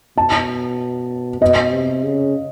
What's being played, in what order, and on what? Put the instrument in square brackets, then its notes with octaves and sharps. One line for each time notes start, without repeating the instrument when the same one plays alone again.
[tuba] B2 [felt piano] A5
[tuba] B2 [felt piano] D#5
[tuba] C3
C#3